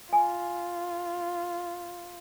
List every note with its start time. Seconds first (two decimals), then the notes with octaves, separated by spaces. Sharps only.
0.13 F4 G#5